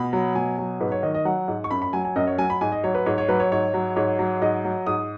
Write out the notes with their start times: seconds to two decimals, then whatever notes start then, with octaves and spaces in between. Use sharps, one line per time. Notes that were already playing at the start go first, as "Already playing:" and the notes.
Already playing: B2 B5
0.13 F#3
0.35 B2 G#5
0.58 F#3
0.80 G#2 B4
0.92 C#5
1.03 D#3 D#5
1.14 D#5
1.25 F#3 F#5
1.48 G#2
1.64 C#6
1.71 F#2 B5
1.82 B5
1.93 F#3 G#5
2.05 G#5
2.16 F#2 D#5
2.27 C#5
2.38 F#3 G#5
2.50 B5
2.61 G#2 G#5
2.72 D#5
2.84 F#3 C#5
2.95 B4
3.06 G#2 C#5
3.18 C#5
3.29 F#3 B4
3.40 C#5
3.52 G#2 C#5
3.74 F#3
3.96 G#2 C#5
4.19 F#3
4.42 G#2 D#5
4.65 F#3
4.87 G#2 D#6